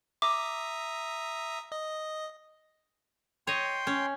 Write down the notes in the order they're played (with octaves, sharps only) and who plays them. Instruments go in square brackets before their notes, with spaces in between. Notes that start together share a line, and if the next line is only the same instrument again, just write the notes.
[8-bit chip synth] E5 A#5 D#6 [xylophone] D6
[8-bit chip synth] D#5
[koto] C#5 D#5 [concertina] G5 C6
[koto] C#4